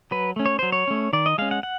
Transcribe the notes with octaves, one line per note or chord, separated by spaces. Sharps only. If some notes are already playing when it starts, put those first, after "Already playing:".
F#3 B4
A3 C#4
C#5
F#3 C5
C#5
A3 C#4
D#3 D5
D#5
G#3 C#4 F5
F#5
F#5